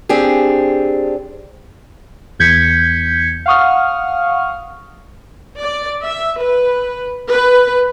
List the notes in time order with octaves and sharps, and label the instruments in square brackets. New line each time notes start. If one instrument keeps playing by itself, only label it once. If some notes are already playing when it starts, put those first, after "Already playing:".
[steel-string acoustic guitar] C4 D4 G4 G#4
[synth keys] E2 G6 G#6 B6 C#7
F5 F#5 C#6 D#6 F6
[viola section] D5
E5
B4
B4